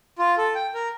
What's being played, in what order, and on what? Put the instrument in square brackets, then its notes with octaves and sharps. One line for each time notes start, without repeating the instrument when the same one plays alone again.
[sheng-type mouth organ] F4
A4
G5
A#4